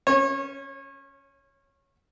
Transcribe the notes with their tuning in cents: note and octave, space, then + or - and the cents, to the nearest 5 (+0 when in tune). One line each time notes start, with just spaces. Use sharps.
C#4 +0 C#5 -30